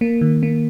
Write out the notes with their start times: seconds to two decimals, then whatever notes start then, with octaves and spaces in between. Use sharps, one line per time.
0.01 A#3
0.21 D#3
0.43 A#3